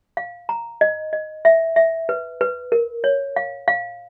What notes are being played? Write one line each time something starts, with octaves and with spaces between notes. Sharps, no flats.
F5
A#5
D#5
D#5
E5
E5
B4
B4
A#4
C#5
F5
F5